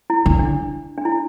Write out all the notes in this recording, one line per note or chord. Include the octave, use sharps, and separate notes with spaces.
E4
D3 D4
D4
D4
E4